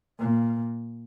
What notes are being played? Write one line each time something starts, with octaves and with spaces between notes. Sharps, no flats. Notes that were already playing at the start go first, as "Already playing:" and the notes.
A#2